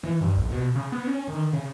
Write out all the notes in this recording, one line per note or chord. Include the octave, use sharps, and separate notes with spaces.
E3
G2
A#1
B2
C#3
B3
C#4
D#3
C#3